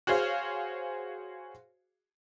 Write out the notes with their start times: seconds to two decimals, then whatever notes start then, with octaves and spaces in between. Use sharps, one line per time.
0.07 F#4 G#4 C5 C#5 F5